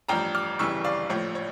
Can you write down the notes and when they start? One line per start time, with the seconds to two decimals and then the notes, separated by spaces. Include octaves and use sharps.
0.09 A1 G2 F3 G5 A#5
0.35 D6 F6
0.59 G1 F2 C#3 E3 G3 C#6 E6
0.84 D5 F5
1.09 A#1 A2 F3 C#5
1.35 C#5